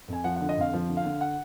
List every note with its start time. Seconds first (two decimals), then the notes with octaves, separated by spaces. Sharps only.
0.08 F2 G#5
0.24 F3 F#5
0.36 D3 F#5
0.49 D#5
0.57 F2 F5
0.73 F3
0.89 D3
0.97 F5
1.05 D3
1.21 F#5